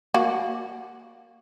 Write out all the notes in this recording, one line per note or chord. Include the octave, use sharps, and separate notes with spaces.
A#3 F#4